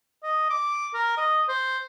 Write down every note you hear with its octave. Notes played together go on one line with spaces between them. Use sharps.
D#5
D6
A#4
D#5
C5